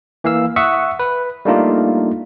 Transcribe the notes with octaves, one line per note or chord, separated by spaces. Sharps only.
E3 A#3 F5 E6
E5 F#5 C#6 D#6 E6 F#6
B4
G3 A3 A#3 D4 D#4 F4